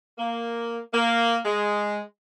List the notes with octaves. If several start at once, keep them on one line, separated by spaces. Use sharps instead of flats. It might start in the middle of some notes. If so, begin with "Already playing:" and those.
A#3
A#3
G#3